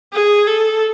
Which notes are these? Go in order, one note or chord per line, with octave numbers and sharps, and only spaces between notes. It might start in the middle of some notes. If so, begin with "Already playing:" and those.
G#4
A4